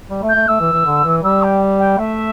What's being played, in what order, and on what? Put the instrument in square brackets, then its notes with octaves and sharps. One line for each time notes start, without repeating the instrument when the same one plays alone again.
[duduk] G3
A3
[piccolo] G6
[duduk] A3
[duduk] A3 [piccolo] E6
[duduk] E3
E3
D3
E3
[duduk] G3 [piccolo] E6
[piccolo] G5
G5
[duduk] A3 [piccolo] E5